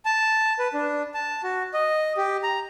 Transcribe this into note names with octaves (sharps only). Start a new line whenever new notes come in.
A5
B4
D4
A5
F#4
D#5
G4
A#5